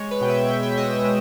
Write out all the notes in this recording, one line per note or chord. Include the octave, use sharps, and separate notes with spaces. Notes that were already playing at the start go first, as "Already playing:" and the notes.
Already playing: G#3 C#5
B4
B2 G5
E5
B2 G5
E5
G#3 D#5
E5
G#3